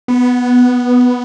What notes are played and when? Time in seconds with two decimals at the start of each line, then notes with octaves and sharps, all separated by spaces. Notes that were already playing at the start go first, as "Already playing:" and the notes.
0.08 B3